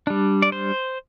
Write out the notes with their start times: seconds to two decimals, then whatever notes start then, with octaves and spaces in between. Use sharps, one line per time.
0.07 G3 D4
0.42 D5
0.52 C5